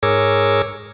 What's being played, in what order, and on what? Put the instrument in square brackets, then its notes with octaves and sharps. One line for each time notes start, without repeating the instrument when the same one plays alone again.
[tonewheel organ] G#2 G#4 A#4 C#5 D6 E6